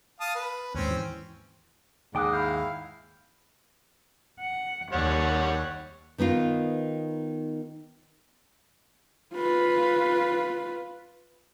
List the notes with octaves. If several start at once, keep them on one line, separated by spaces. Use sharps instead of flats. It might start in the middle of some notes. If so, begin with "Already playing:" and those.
F5 A5 D#6
B4
D#2 G#2 C4 C#4
E3
D#2 G#2 G5 D6 D#6 F#6
E4 F5 B5 F6 G6
F#5
D#2 G3 C#5 F#5
D#3 B3 D#4 F4
F4 B4